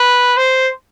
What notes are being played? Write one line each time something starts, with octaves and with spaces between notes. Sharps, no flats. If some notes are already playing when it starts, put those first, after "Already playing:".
Already playing: B4
C5